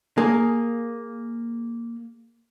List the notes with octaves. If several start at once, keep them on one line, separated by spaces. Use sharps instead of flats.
A#3 G#4